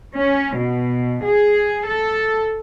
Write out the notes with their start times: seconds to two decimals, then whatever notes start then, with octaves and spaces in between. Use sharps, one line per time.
0.16 C#4
0.56 B2
1.25 G#4
1.88 A4